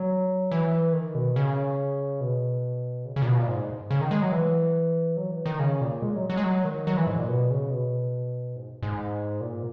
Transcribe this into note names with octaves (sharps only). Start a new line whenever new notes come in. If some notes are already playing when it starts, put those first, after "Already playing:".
Already playing: F#3
E3
D#3
B2
C#3
B2
C#3
C#3
A#2
B2
A#2
G#2
C#3
D#3
G#3
F#3
E3
F#3
E3
D#3
C#3
A#2
G#3
F#3
F#3
G#3
F#3
D#3
F#3
E3
G#2
A#2
B2
C#3
B2
G#2
G#2
A#2